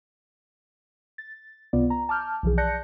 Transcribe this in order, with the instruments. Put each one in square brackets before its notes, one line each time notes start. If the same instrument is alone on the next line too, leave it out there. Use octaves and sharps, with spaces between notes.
[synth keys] A6
C#2 C3 B3 F4 D5
A#5
A5 D6 F6 G6
B1 E3 F3 G#4
D5 A5 F#6 G6 A#6 C#7